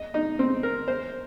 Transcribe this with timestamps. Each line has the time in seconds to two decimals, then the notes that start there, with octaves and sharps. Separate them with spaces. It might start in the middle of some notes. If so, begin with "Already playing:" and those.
Already playing: D#5
0.14 D#4
0.39 C4
0.63 A#4
0.88 C5